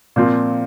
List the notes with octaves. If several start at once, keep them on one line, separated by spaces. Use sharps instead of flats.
A#2 F3 C4 F4